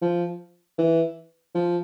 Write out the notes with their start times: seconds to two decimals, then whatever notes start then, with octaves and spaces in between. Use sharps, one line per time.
0.02 F3
0.78 E3
1.55 F3